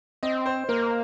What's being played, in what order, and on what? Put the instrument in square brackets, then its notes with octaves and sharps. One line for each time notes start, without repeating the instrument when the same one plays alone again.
[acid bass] C4 [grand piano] D#5
[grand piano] C5
[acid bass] A#3 [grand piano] A#4